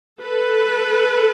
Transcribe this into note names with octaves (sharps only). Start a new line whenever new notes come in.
A4 B4